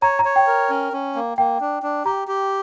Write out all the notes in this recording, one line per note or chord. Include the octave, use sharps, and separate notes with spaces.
C#5 A#5
A#5
C#5
G5
A#4
C#4
C#4
A#3
A#3 G5
D4
D4
G4 A#5
G4